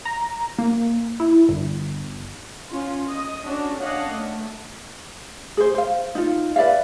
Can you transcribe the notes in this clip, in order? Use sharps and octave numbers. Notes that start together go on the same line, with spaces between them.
A#5
A#3
E4
G1
C#4 F4
D#5
C#4 D4 F#4
C#4 D4 C#5 D#5 F5 F#5
A3
G#4 C5
C5 F5
D#4 F4
B4 D5 E5 F5